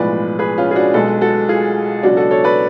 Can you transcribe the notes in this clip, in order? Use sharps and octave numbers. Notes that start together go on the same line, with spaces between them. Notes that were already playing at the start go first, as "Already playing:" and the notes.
Already playing: B1 A2 F3 G#3 B4 D5
G#4 B4
C#4 F4
G#4
D4 F#4
B1 B2 G#3 F#4 A4
F#4 A4
F4 G#4
C#2 B2 F#3 D4 F#4
F#4 A4
A4 C#5
B4 D5